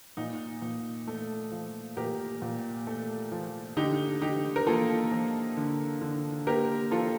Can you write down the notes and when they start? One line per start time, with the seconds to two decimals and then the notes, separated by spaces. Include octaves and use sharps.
0.17 A#2 D#4
0.62 A#2
1.07 A3
1.52 F3
1.97 A#2 G4 A#4
2.42 A#2
2.87 A3
3.32 F3
3.77 D3 D#4 G4
4.22 D3 D#4 G4
4.56 A#4
4.67 A#3 F4 A4
5.12 F3
5.57 D3
6.02 D3
6.47 A#3 G4 A#4
6.91 F3 F4 A4